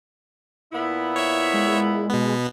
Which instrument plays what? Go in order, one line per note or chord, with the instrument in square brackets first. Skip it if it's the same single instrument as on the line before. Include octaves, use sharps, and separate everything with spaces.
[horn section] A#2 B3 E4
[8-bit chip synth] C#5 E5
[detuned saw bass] G#3
[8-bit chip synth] B2 B3